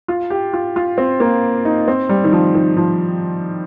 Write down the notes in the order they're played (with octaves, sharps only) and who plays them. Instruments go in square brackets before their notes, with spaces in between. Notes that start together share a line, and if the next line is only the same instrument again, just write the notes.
[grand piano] F4
G4
F4
F4
C4
A#3
D#4
C4
G3
D#3
F3
D#3
F3